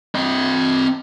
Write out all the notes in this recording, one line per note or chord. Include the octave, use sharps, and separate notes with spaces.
C4 D#5